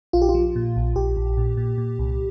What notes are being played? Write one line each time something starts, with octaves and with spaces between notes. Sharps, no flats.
A#1 F4
G4
F4
F3
A#2
A#1
A#1 G4
A#1
A#2
A#2
A#2
C2